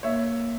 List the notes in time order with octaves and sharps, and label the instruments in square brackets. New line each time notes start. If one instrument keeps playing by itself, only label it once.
[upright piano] A#3 [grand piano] C#5 E5